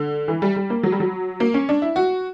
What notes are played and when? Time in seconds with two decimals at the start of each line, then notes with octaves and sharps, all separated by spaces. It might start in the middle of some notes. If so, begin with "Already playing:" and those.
Already playing: D3
0.28 E3
0.42 G3
0.56 G3
0.70 A#3
0.83 F#3
0.92 G3
1.00 F#3
1.40 A#3
1.54 C#4
1.69 D4
1.82 E4
1.96 F#4